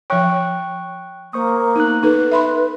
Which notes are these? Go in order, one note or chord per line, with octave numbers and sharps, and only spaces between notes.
F3 C#5 G5 C#6 F#6
A#3 C5 C#6 D#6
B3 D#4 F#6
D#4 A4 B4
E5 B5 C6